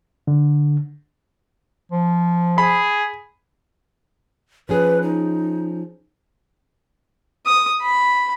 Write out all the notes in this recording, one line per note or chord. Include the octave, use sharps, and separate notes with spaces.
D3
F3
G#4 B5
F3 C#4 G#4 B4
D#4
D#6
B5